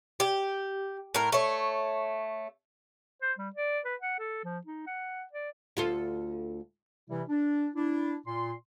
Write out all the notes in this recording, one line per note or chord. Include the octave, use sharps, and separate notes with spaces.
G4
A2 A#4
A3 C#5
C5
G3
D5
B4
F#5
A4
F3
D#4
F#5
D5
D2 F4 A4
C3 E3 G3 E4
D4
D4 E4
A#2 C6